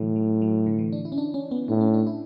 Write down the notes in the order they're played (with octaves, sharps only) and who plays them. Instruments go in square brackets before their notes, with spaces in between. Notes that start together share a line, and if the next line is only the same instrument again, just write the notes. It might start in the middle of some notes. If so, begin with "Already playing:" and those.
Already playing: [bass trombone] A2 [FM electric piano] D3 E3 F#3
[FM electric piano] F#3
F#3
D3
E3
D4
E4
C#4
D4
C#4
B3
[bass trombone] A2 [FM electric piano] D4
[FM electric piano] C#4
D4
E4